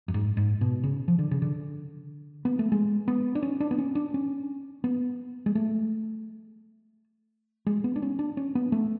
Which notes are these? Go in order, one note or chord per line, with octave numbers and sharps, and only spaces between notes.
F#2
G#2
G#2
B2
C#3
F3
D3
C#3
D3
B3
A3
G#3
B3
D4
C#4
D4
B3
C#4
D4
C#4
B3
G#3
A3
G#3
B3
D4
C#4
D4
C#4
B3
A3